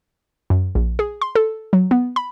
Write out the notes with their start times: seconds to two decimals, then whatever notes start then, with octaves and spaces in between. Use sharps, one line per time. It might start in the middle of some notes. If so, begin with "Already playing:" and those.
0.50 F#2
0.75 A#1
0.99 G#4
1.22 C6
1.35 A4
1.73 F#3
1.91 B3
2.16 B5